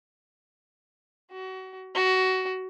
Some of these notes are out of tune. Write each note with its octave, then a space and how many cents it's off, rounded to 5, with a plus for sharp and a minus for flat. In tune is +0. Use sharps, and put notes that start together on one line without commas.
F#4 +30
F#4 +20